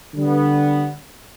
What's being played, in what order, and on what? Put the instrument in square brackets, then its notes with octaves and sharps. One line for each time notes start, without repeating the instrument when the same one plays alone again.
[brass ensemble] D3 G3 B3